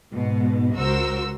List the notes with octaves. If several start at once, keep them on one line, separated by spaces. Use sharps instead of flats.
G#2 B2
C#2 F#4 A#4 C5 E6